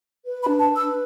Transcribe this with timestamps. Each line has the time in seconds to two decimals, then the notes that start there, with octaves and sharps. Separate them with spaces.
0.25 B4
0.41 B5
0.47 D4
0.58 A5
0.70 B4
0.76 E6